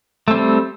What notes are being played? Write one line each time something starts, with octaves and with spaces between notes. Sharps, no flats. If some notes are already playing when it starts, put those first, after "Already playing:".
G3 A3 C4